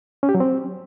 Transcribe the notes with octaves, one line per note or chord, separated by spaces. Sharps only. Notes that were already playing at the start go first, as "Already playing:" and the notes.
C#4
G4
F#3
C4